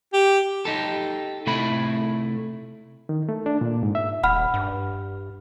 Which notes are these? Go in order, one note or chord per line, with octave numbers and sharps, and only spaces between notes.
G4
D#4 G4 A4
C3 A3 E4 B5
D#3
A3
D4
A#2
G#2
E5
D#1 F#5 B5 F6
G2